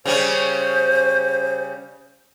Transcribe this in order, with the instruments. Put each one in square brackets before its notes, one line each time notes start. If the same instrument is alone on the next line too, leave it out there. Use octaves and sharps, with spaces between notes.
[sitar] C#3 G3 C#4 [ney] C5